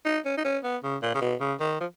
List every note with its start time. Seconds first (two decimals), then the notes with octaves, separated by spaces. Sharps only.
0.05 D#4
0.25 C#4
0.37 D#4
0.44 C#4
0.64 B3
0.83 C#3
1.02 A#2
1.15 C#3
1.21 B2
1.41 C#3
1.60 D#3
1.80 F3